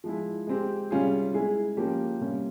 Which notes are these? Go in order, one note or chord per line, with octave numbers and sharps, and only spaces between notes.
F3 G#3 E4
G#3 C4 G4
C3 G3 C#4 F4 G#4
G#3 E4 G#4
F3 A#3 C#4 G4
C3 G3 A#3 C#4 F4